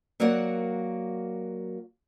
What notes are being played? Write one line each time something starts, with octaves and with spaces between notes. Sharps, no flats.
F#3 A#3 F#4 A#4 D5 F#5